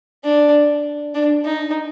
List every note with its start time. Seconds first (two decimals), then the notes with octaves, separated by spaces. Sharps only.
0.24 D4
1.15 D4
1.45 D#4